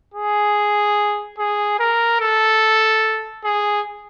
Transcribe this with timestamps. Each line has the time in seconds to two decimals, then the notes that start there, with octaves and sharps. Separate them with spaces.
0.14 G#4
1.39 G#4
1.79 A#4
2.20 A4
3.44 G#4